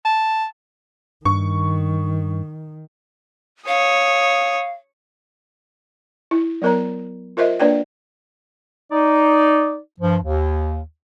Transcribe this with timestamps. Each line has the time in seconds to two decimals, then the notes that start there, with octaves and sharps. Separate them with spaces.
0.05 A5
1.25 G2 D#3 C#6
3.68 C#5 F5 D#6
6.31 E4
6.62 F#3 B3 A#4 C#5 A#5
7.37 F4 A#4 C5 D#5 E5
7.60 A#3 D4 B4 C#5 D5 G5
8.92 D#4 D5
10.00 G2 F3
10.23 D#2